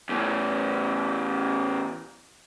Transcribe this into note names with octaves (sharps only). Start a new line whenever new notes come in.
E2 A2